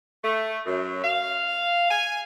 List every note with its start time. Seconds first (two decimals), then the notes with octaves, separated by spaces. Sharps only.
0.24 A3
0.66 F#2
1.04 F5
1.91 G#5